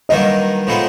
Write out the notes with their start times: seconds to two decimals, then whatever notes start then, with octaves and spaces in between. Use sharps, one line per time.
0.09 G2 D#3 F#3 A#3 D#4 D#5
0.67 A2 F3 G#3 B3 D#4